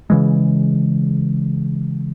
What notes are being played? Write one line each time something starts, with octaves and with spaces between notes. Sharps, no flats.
C#3 E3 G#3